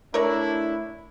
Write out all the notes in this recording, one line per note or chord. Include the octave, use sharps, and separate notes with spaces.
A3 D4 E4 A#4 C#5 D5